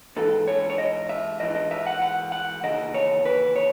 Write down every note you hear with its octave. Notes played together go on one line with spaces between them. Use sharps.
G#2 E3 A4
C#5
C#5
D#5
E5
G#2 E3 D#5
D#5
E5
F#5
F#5
F#5
D#2 C#3 E3 D#5
C#5
B4
C#5